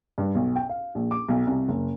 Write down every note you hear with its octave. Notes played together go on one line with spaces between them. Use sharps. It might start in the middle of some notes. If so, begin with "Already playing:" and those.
G2
B1
G5
F5
A#1
D6
B1
C2
F#1